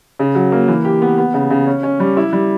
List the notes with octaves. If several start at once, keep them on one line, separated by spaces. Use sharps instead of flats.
C#3
F#3
A#3
E3
G4
B3
B3
C#3
C#3
C#4
C#4
G3
E4
G3